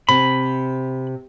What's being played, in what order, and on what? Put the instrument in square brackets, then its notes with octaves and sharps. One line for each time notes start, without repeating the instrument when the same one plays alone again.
[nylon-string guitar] C3 [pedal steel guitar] B5